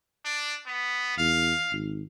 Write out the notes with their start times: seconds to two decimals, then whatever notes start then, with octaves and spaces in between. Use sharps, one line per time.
0.25 D4
0.66 B3
1.18 E2 F5
1.72 G#1